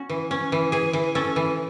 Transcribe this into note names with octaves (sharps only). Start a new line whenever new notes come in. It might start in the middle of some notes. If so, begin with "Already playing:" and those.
Already playing: C#4 F#4
E3
C#4
E3
E3 G#4
E3
C#4 A4
E3